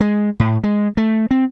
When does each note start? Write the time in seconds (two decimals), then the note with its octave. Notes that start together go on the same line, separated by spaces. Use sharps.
0.01 G#3
0.40 A2
0.64 G#3
0.97 A3
1.31 C4